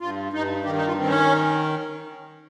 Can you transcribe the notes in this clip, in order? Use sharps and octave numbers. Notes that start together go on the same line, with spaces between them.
G2 F4
G2 D#4
D#3 G4
D#4
F4
D#3 C4
C#4